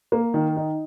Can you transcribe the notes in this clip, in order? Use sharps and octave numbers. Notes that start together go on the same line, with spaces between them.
A#3
D#3
D#4